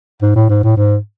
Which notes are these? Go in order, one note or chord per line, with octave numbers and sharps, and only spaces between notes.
G#2
A2
G#2
A2
G#2